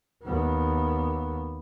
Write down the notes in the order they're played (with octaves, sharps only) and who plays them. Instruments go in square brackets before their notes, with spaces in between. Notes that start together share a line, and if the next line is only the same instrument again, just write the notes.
[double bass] D#2 B3